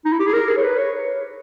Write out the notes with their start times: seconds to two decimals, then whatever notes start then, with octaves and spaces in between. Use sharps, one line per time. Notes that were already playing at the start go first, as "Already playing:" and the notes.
0.05 D#4
0.13 E4
0.20 G4
0.27 G#4
0.33 A#4
0.49 G#4
0.57 C#5
0.64 B4
0.79 C#5